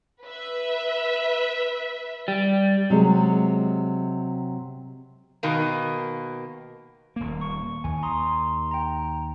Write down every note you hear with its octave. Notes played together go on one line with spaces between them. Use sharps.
B4 E5
G3
C3 F#3 G#3
B2 D#3 A#3
D#1 A#3
C#6
D#2 G#5
A#5 C6 D#6
G5 A#5